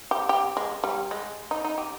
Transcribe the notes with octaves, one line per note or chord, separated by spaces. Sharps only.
G4
G4
G#3
G3
G#3
D#4
D#4
G4